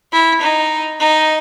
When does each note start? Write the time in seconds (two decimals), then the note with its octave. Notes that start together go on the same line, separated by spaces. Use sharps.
0.12 E4
0.41 D#4
1.00 D#4